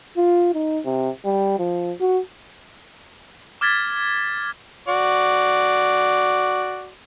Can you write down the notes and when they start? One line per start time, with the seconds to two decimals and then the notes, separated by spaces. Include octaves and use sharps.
0.17 F4
0.54 D#4
0.85 C3
1.25 G3
1.59 F3
2.00 F#4
3.61 D6 F6 G#6 A6 B6
4.88 F#4 D5